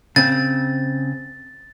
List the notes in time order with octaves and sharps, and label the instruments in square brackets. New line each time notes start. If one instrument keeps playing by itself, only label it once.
[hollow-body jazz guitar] C#3 C4 [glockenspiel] A6